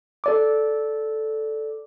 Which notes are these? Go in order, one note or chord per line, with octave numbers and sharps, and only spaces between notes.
A4 D5 D6